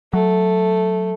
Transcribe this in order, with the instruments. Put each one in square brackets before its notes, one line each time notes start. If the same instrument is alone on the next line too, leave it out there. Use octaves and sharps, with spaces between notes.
[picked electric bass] F#3 [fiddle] A3